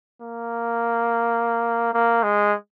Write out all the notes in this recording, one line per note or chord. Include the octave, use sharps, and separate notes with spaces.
A#3
A#3
G#3